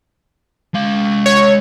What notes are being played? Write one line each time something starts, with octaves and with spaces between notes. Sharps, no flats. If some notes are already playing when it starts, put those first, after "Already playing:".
G#3 F5
C#5